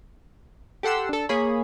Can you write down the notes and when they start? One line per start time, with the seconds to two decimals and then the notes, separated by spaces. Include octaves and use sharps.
0.83 G4 A4 F#5 C6 E6
1.09 D4 A4
1.29 A#3 G#4 C#5 B5